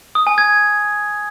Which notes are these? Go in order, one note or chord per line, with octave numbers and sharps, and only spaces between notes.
D#6
G#5
G#6